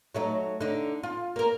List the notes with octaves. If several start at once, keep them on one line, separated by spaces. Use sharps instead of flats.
F#3 A3 D#4
D3 D#4
F4
A#3 A#4